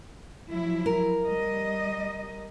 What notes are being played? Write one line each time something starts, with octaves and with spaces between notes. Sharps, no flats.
F3 F#3 E4
A#4
G3 D#5